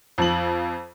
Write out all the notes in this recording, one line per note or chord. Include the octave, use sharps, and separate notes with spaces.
F2 F3 F#7